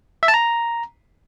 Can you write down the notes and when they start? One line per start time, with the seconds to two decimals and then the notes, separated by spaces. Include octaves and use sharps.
0.23 E5
0.28 A5
0.34 A#5